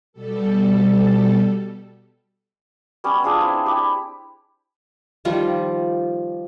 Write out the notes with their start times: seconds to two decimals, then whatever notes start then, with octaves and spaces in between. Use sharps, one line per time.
0.13 B2 G3 A4
3.04 G3 B3 C#4
3.24 D4 F4 G#4 C#5
3.40 C4 E4
3.66 G4 B5
5.25 D#3 F3 G3 F4